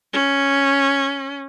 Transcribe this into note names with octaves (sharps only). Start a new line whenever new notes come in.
C#4